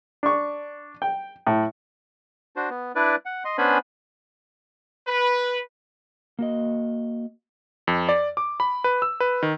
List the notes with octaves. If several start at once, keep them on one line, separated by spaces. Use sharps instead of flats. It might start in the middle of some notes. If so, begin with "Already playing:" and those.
D4 C#6
G5
A2
D4 F#4 C5
B3
D4 E4 B4 D5
F#5
D#5 C6
B3 C#4 D4 C5 G#5 B5
B4
A#3 F#4 D#5
F2
D5
D6
B5
B4
E6
B4
D#3